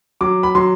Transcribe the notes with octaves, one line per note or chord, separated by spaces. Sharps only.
F#3 D6
B5
F#3 C6